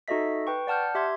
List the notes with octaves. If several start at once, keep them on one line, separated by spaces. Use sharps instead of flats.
D#4 F#4 A4 D#5 E5 B6
B4 G5 C#6
D5 F#5 A5 F6 G6
G4 E5 C6 G#6